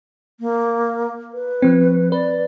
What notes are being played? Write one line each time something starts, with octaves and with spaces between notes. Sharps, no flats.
A#3
B4
F3 C4
B4 D5